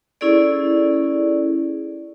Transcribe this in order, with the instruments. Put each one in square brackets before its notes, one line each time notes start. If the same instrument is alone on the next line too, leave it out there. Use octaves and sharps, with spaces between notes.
[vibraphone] C#4 E4 G#4 A4 D5